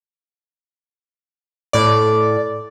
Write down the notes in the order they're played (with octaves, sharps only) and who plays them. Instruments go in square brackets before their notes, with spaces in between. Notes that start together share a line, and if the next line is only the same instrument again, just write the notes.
[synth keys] A2 D5